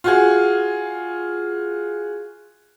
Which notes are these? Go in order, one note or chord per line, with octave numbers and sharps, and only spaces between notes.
F4 F#4 G#4